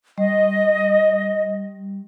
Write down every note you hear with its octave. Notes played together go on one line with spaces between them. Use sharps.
G3 D#5